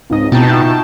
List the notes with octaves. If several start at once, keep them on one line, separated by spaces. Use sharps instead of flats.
C#2 G#2 C4 D#4 D#5
B2 B3 C4 D#4 E4 G5 A5
F4 E5